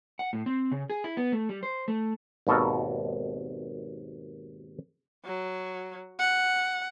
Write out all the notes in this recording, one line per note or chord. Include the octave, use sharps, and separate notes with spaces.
F#5
A2
C4
C#3
G#4
E4
B3
A3
G3
C5
A3
G#1 D#2 B2 A4 A#4
F#3
F#5